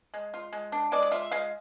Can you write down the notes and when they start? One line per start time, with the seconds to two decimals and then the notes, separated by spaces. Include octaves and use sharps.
0.14 G#3
0.34 F4
0.53 G#3
0.72 D4
0.92 G#3 D5
1.02 D5
1.11 F4 E5
1.31 G#3 F5